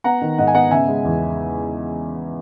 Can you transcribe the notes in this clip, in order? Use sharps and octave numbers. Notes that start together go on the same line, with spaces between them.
B3 F#5 A#5
D#3
G#2 D#5 F#5
G#5
B3 D#5 F#5
C#3 E5 G#5
G#3
E2